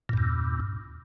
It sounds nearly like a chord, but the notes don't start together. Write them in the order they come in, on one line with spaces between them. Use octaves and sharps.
A#2 G2 E2